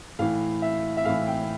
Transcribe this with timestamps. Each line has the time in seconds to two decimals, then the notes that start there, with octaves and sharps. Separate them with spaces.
0.19 A2 E3 F5
0.62 E5
0.97 E5
1.05 A2 E3 F5
1.27 G5